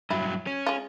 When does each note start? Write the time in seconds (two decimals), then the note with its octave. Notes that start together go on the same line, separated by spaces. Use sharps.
0.10 G2 F#3 E4
0.47 C#4
0.67 G#3 F4